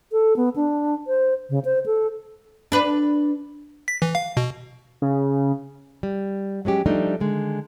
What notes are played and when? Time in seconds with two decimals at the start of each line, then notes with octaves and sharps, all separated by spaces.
0.12 A4
0.37 B3
0.56 D4
1.07 C5
1.50 C#3
1.65 C5
1.86 A4
2.72 D4 B4
3.88 B6
4.02 E3
4.15 F5
4.37 B2
5.02 C#3
6.03 G3
6.65 F#3 G#3 C#4 G4
6.86 F3 G3 A3 D4 D#4
7.20 D3 D#3 G#3